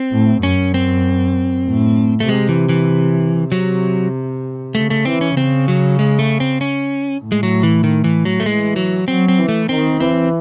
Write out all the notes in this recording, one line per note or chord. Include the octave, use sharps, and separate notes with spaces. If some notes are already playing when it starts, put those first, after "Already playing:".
Already playing: C4
A2
F#2 C#4
C4
A2
A3
C3 G#3
E3
E3
C3 F#3
C#3 A3
A3
E3 C4
C#4
C#3 C4
F#3
G#3
A3
C4
C#4
A2
G#3
F#3
E3
D#3
E3
F#3
A3
E3 G#3
F#3
F#3 C4
C4
E3
A3
D#3 C4
E3 C4